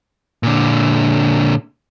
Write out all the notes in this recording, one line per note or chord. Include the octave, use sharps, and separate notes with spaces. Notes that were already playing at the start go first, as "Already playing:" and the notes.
A#2 D3